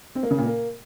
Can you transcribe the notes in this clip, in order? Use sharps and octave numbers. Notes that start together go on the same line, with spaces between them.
C4
A#3
C#3
A#2
A#3